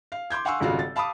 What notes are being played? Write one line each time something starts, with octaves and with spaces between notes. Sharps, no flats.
F5
C6 D6 G6 G#6
F5 F#5 G#5 C6 C#6 E6
D#1 G#1 C#3 F4 F#4 F5
A6
F5 A5 B5 D6 D#6